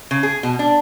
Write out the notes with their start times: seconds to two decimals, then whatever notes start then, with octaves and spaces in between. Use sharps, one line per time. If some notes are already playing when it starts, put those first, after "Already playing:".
0.11 C#3
0.23 G#4
0.43 B2
0.59 D4